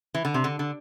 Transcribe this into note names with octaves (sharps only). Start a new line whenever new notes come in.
E3
D3
C3
D3
D3